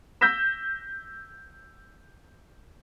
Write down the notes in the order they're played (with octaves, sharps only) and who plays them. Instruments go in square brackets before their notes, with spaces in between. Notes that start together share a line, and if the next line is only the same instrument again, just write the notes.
[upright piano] E6 G6 A#6 B6 E7